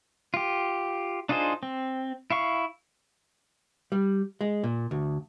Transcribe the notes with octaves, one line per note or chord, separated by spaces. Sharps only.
F4 G4
D4 D#4 F4 G#4 C5
C4
E4 F5 C#6
G3
G#3
A#2
D2